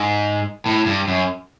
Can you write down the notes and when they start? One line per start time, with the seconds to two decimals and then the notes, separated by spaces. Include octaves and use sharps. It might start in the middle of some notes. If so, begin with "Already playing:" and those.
Already playing: G#2
0.66 A2
0.86 G2
1.08 F#2